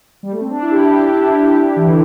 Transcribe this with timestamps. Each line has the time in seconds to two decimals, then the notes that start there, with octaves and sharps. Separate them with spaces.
0.23 G3
0.32 A3
0.41 C4
0.50 D4
0.62 E4
0.71 G4
0.92 G4
1.07 D4
1.13 E4
1.34 G4
1.76 E3
1.86 D3